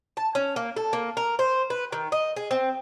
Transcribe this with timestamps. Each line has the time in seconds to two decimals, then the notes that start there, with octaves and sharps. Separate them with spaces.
0.17 A5
0.35 C#4
0.56 A#3
0.76 A4
0.93 A#3
1.17 A#4
1.39 C5
1.70 B4
1.92 D#3
2.12 D#5
2.36 G#4
2.51 C4